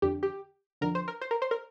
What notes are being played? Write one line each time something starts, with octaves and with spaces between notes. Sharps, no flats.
F2 D3 G4
G4
F2 D3 A#4
C5
A#4
C5
A#4
C5
A#4